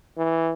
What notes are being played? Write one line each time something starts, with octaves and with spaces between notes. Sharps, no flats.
E3